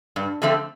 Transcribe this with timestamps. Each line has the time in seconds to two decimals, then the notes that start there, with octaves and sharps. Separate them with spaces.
0.16 G2
0.42 D3 F3 A3 C4